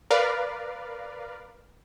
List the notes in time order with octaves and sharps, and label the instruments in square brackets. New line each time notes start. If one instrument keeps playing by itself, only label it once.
[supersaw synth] A#4 B4 D5 F5